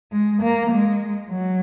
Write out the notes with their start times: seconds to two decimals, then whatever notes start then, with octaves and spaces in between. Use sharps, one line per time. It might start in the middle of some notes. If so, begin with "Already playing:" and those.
0.12 G#3
0.42 A#3
0.71 G#3
1.29 F#3